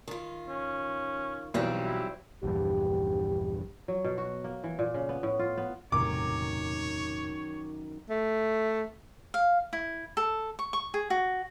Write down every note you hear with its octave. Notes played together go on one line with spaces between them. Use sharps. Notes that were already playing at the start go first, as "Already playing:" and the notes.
D#3 F4
C#4
B1 E3 F#3 G3 C4
E4
A#1 E2 G2 G4
F#3
B2
F#4
A#3
E3
A#2
C#3
B3
A2
F4
B3
E1 F#2 A2 C3 D#3 C#5 D6
A3
F5
E4
A4
C#6
C#6
G#4
F#4